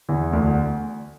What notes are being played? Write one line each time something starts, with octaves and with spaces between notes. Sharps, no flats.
E2 E3
D2 D3